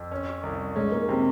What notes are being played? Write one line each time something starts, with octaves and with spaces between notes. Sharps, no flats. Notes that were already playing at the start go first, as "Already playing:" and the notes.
Already playing: F2
C#4
C2
G#3 C#4
A#3
C3 C4